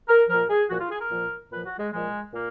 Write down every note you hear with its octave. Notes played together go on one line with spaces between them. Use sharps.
A#4
A#2 F3 A#4
G#4
A#2 F3 F#4
F4
G#4
A#4
A#2 F3
A#2 F3 B4
F#4
G#3
A#2 F3 G#3
A#2 A#3